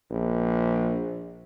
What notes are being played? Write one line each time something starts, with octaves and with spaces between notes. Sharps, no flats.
A#1